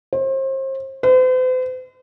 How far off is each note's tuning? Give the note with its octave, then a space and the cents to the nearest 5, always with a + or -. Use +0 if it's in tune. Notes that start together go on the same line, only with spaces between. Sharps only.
C5 +35
C5 -45